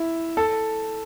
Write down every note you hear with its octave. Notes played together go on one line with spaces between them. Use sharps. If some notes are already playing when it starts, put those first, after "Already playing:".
Already playing: E4
A4